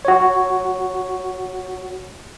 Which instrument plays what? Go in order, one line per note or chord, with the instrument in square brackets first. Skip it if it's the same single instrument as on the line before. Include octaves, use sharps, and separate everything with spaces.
[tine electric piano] F#4 C#5